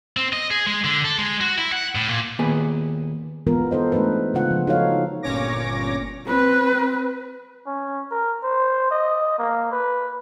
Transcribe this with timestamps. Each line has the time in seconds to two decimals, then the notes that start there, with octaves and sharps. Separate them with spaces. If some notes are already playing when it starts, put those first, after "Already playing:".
0.17 C4
0.33 D#5
0.51 G#4
0.66 G#3
0.84 D3
1.04 A4
1.19 G#3
1.41 F#4
1.58 E4
1.72 F#5
1.95 A2
2.08 A#2
2.39 D#2 A#2 B3 G#4
3.47 E3 G#3 B3 F4 A#4
3.71 D#4 A4 C5 D#5
3.92 G#3 A3 D4 A#4 B4
4.34 C#3 G#3 F4 F#5
4.51 F3
4.67 D#4 F#4 A4 C5 C#5 F5
5.23 G1 A#2 C#4 C#5 D6 A#6
6.26 C4 B4
7.66 C#4
8.11 A#4
8.43 C5
8.91 D#5
9.39 A#3
9.72 B4